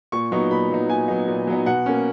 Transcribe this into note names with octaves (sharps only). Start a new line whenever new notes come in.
A#2 C#6
F#3 B3 D#4 C#6
A#2 B5
F#3 B3 D#4
A#2 G#5
F#3 B3 D#4
A#2
F#3 B3 D#4
B2 F#5
A#3 C#4